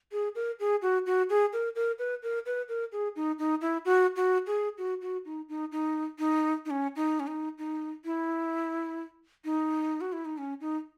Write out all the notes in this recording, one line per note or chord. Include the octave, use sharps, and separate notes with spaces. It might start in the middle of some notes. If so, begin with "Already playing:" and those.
G#4
A#4
G#4
F#4
F#4
G#4
A#4
A#4
B4
A#4
B4
A#4
G#4
D#4
D#4
E4
F#4
F#4
G#4
F#4
F#4
D#4
D#4
D#4
D#4
D#4
C#4
D#4
C#4
D#4
D#4
E4
D#4
F#4
E4
D#4
C#4
D#4